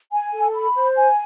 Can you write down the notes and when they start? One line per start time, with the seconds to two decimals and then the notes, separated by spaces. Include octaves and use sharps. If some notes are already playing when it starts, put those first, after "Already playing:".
0.13 G#5
0.33 A4
0.54 B5
0.75 C5
0.95 G#5